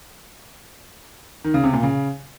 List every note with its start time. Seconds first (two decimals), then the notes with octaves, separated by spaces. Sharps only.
1.44 D#3
1.54 C#3
1.64 C3
1.73 A#2
1.83 C#3